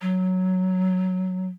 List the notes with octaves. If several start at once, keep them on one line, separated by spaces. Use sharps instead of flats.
F#3